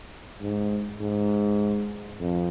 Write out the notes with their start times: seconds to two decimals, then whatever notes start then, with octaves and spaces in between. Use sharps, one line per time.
0.41 G#2
1.01 G#2
2.19 F2